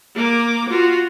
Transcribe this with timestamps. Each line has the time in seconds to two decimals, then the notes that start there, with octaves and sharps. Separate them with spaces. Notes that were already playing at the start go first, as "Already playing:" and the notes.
0.16 A#3 D6
0.69 F4 F#4